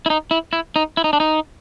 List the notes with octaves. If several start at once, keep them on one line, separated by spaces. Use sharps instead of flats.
E4
D#4
E4
E4
D#4
E4
D#4
D4
D#4